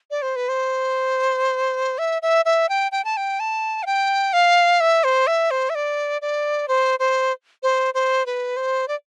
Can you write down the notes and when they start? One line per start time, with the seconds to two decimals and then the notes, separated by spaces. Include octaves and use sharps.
0.11 D5
0.22 C5
0.36 B4
0.49 C5
1.98 E5
2.22 E5
2.45 E5
2.69 G5
2.92 G5
3.05 A5
3.17 G5
3.40 A5
3.83 F5
3.86 G5
4.33 F5
4.80 E5
5.04 C5
5.27 E5
5.51 C5
5.70 E5
5.75 D5
6.22 D5
6.68 C5
6.99 C5
7.63 C5
7.94 C5
8.26 B4
8.57 C5
8.88 D5